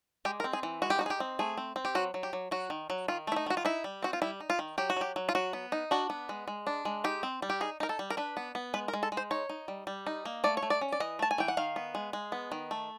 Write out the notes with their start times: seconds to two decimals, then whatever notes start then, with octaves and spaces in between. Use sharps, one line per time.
0.25 G#3 G4
0.40 A#4
0.44 C4
0.53 G#4
0.63 E3
0.82 G#3 F#4
0.90 G4
0.99 D#4 F#4
1.06 G#4
1.10 G4
1.20 C4
1.39 A3 G#4
1.57 C4
1.76 C4
1.85 G4
1.95 F#3 F#4
2.14 F#3
2.23 G4
2.33 F#3
2.51 F#3 F#4
2.70 D#3
2.90 F#3
3.08 D#3 F4
3.27 A3 E4
3.36 D#4
3.46 D#3 F#4
3.57 F4
3.65 D#4 E4
3.84 G3
4.02 C4 F#4
4.13 F4
4.22 G3 E4
4.40 D#4
4.50 F4
4.59 D#3
4.78 F#3 G4
4.90 F#4
4.96 F#3 G4
5.16 F#3
5.29 F4
5.35 F#3 F#4
5.53 B3
5.72 D#4
5.91 D4 F#4
6.10 B3
6.29 G#3
6.48 G#3
6.67 D4
6.85 G#3
7.04 D#4 G4
7.23 C4
7.42 G3
7.50 G4
7.61 D#4 G#4
7.80 D#4 A#4
7.89 A4
7.99 G3
8.10 A#4
8.17 D4 B4
8.37 B3
8.55 B3
8.74 G#3 B4
8.88 A#4
8.93 G#3
9.03 A4
9.12 G#3
9.17 C5
9.31 D#4 C#5
9.49 D#4
9.68 G3
9.87 G3
10.06 D#4
10.25 A#3
10.44 A3 D5
10.57 C#5
10.63 A3
10.70 D5
10.81 C#4
10.92 D5
11.00 E3 D#5
11.19 A3 A5
11.31 G#5
11.38 E3 G5
11.48 F#5
11.57 D#3 F5
11.76 B3
11.95 G#3
12.13 G#3
12.32 B3
12.52 D#3
12.71 A3